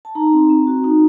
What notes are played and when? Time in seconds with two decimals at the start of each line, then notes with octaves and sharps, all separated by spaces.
0.05 A5
0.15 D#4 A#5
0.33 C4
0.49 C4
0.67 F#4
0.84 D#4